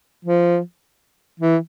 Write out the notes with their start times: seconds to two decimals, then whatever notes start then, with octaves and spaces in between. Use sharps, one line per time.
0.25 F3
1.40 E3